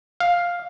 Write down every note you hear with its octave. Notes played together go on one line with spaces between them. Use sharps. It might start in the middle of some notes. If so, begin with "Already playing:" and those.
F5